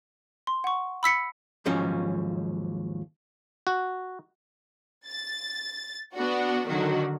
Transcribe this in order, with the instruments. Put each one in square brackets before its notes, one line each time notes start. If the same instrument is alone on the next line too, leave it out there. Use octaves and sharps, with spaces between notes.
[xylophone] C6
F#5 C#6
B5 E6 B6 C#7
[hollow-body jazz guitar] D#2 G#2 F3 F#3 C#4
[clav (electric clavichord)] F#4
[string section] A6
B3 D4 F#4
D3 D#3 F#3 F#4